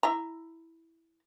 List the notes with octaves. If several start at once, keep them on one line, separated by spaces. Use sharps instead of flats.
E4 E5 A#5